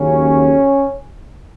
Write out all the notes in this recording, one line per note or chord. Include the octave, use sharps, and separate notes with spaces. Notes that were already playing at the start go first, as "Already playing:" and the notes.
Already playing: D#2 C#3 F#3 A#3 C#4